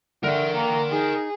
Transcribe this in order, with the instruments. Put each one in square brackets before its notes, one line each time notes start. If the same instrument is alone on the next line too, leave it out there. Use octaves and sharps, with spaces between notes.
[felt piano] D3 [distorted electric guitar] A#4 G5 [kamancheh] E5
[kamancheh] A#3 [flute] A#5
[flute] D#4 [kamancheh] G#4